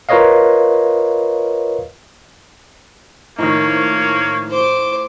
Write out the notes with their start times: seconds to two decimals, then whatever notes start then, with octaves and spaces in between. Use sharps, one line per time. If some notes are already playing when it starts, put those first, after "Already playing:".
0.09 F4 A#4 B4 C#5 D#5 F5
3.39 A2 D#3 F3 A#3 D#4 C#5 C#6
4.50 C5 D6